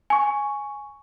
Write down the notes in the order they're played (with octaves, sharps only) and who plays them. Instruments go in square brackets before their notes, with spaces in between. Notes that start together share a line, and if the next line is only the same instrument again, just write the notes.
[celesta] G#5 C#6